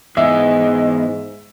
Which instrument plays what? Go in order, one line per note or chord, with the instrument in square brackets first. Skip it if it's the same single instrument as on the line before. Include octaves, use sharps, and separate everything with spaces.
[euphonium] G#2 [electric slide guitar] E3 B3 G#4 [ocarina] D#5 [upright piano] E5